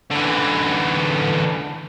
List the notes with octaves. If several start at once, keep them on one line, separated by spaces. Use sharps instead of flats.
D3 E3